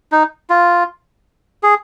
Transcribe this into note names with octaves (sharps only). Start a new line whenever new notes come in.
D#4
F4
G#4